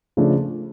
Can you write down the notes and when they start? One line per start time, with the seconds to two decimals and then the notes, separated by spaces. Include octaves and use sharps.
0.17 C#3 F3 A3 D4